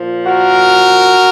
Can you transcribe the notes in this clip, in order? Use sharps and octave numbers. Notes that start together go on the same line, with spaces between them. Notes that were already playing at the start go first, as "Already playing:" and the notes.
Already playing: A#2 F3
F#4 A#4